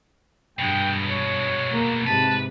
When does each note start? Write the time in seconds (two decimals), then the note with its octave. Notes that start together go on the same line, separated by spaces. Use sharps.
0.59 G2 B2 G#3 G5
1.08 C#5
1.70 A#3
2.07 G#2 C3 B4 A5